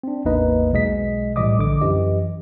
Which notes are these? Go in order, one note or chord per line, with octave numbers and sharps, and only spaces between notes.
C4 D4
A1 E2 A#3 D#4 B4 D#5
B1 B2 G#3 D#5 B6
A2 E3 G3 D#5 D6 D#6
A#1 D3 D6
F#2 E3 G4 D#5